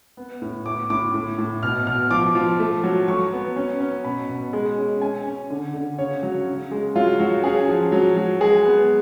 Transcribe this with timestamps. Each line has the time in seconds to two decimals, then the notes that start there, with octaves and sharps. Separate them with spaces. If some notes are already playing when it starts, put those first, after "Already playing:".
0.17 B3
0.42 A2
0.65 A2 D6
0.90 A2 D6
1.14 A2
1.38 A2
1.63 B2 F6
1.87 B2 F6
2.11 F3 D6
2.35 F3
2.60 A3
2.83 F#3
3.08 F#3 C#6
3.32 B3
3.56 C#4
3.80 C#4
4.04 B2 B5
4.29 B2
4.53 G#3
4.78 C#4
5.01 C#4 G#5
5.25 C#4
5.50 D3
5.74 D3
5.98 C#3 C#5
6.23 F#3
6.47 C#3
6.71 G#3
6.95 F#3 F4
7.19 F#3 F#4
7.44 C#4 G#4
7.68 F3
7.92 F#3
8.17 F#3
8.41 G#3 G#4
8.65 B3